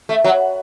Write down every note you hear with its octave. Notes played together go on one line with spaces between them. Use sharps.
A3
F#3